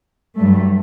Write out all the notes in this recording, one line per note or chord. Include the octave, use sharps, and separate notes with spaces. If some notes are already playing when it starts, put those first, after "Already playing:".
G2 F#3 A3